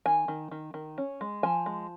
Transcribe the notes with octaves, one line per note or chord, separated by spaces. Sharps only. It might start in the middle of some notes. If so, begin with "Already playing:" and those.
D#3 G#5
D#3
D#3
D#3
C#4
G#3
F3 G#5
G#3